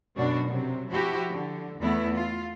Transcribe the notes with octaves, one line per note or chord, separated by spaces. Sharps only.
F#2 B2 D4 F#4
C3 F#3
F3 E4 F#4 G4
D3
E2 A3 B3 E4
F4